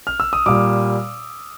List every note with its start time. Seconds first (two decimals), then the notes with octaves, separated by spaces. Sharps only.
0.07 F6
0.20 E6
0.33 D#6
0.46 A#2 G3 D6